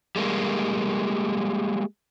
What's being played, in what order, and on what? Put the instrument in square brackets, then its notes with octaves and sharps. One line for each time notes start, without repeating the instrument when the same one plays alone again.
[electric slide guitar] G3 G#3 A#3